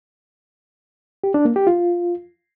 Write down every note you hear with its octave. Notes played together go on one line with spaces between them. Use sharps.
G4
D4
A#3
G4
F4